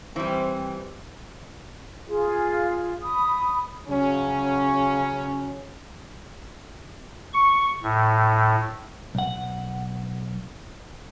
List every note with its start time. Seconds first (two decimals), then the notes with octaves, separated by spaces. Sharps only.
0.16 E3 G3 C4
2.08 F4 G#4
3.03 B5 D#6
3.88 C#3 F#3 C#4
7.34 C#6
7.83 A2
9.15 B1 F#5